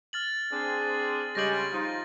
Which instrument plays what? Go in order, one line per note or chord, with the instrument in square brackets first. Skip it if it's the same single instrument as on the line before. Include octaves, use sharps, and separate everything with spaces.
[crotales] F6 A6 F#7
[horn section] C4 D4 G#4
[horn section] C#3 G3 G#3 [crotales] A#6 F#7
[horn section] F3 D#4 F4